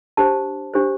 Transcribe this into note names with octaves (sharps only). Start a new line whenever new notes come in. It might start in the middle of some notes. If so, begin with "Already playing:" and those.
D4 G4 C5 A5
D4 G4 C5